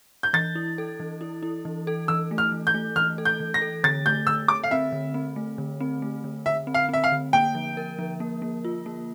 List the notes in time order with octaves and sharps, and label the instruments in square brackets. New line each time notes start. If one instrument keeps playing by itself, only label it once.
[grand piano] G6
[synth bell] E3 [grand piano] A6
[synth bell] E4
A4
E3
E4
E4
E3
A4
[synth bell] E3 [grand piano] E6
[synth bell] A3
[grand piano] F6
[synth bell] E3
[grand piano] G6
[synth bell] A3
[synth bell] E3 [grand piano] F6
[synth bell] A4
[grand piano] G6
[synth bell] E3
[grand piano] A#6
[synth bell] A4
[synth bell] D3 [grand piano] A6
[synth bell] A3 [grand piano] G6
[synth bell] D3 [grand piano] E6
[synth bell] D3 [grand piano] D6
[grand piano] F5
[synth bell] C4 [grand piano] E5
[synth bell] D3
C4
A3
D3
C4
A3
D3
[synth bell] D3 [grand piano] E5
[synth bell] C4
[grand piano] F5
[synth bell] C4 [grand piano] E5
[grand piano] F5
[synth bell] D3
[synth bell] A#3 [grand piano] G5
[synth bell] F3
A#4
F3
A#3
A#3
F4
A#3